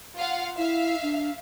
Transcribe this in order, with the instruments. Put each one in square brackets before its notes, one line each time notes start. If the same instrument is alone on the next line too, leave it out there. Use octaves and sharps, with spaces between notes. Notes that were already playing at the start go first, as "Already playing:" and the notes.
[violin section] F4 F5 F#5
[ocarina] E4 [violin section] E5 F5
[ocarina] D4